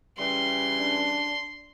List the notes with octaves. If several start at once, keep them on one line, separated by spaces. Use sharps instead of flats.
C#3 E3 G3 C6
D4